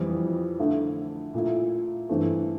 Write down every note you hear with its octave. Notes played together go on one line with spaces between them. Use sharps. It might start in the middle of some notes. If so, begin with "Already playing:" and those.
Already playing: F2 E3 G3
D3 A3 E4
A#2 A3 E4
G2 E3 A3 C4